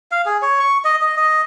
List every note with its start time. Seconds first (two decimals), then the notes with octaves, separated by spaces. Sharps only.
0.12 F5
0.26 G#4
0.42 C#5
0.60 C#6
0.84 D#5
1.02 D#5
1.17 D#5